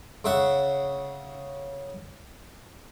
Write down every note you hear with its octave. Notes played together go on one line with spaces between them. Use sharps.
C#3 E5 F#5